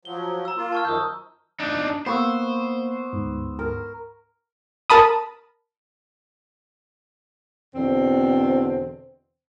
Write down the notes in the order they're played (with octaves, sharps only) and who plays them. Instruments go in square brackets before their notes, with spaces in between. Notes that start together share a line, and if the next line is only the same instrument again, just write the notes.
[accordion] F3 F#3 [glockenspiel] G7
[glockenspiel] A#5 E6
[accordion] A#3 F4
[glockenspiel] A5 C#6 F6
[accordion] F#2 D#3 F3 [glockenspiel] D#6 E6 G6
[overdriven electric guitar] D4 D#4
[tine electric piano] A#3 [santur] B3 C#6 E6 [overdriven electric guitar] C5
[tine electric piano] D2 G#2
[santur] A#4
[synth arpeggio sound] A#4 A5 B5 D#6
[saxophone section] E2 B2 D3 C4